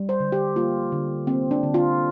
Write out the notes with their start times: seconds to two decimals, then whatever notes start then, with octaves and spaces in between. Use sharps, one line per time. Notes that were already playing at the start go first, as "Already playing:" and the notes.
Already playing: G3
0.09 C5
0.20 D3
0.32 G4
0.56 A#3 F4
0.92 D3
1.27 A#3 C4
1.51 D4
1.63 D3
1.74 F4